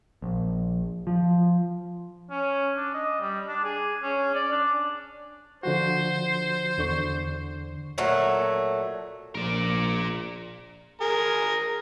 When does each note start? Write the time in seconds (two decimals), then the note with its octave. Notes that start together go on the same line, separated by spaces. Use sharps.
0.22 A#1
1.07 F3
2.31 C#4
2.77 D4
2.94 D#5
3.20 G3
3.48 D4
3.64 G#4
4.03 C#4
4.34 D5
4.52 D4
5.63 D3 F3 F#4 C5
6.78 E2 D3 C#6
7.98 A#2 F#3 A3
9.35 A#1 A#4 D5
11.01 G#4 A#4